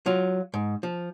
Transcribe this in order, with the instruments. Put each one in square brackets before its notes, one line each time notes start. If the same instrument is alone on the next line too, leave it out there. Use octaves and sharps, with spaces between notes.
[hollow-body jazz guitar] F#3 F4
G#2
F3